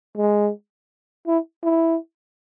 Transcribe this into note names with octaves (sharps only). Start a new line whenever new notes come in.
G#3
E4
E4